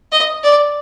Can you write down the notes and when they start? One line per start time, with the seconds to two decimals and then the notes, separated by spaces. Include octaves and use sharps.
0.12 D#5
0.44 D5